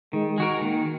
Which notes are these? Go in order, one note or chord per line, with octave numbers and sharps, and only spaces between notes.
D#3 G#3
G#3 F#4 A#4
D#3 A#3